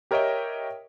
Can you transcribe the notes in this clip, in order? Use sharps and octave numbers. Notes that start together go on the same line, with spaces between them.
G4 A#4 C#5 D#5 E5 G5